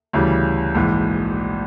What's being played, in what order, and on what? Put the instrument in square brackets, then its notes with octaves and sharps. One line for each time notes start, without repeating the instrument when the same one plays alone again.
[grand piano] D2 C#3 E3 G3
A#1 G#2 E3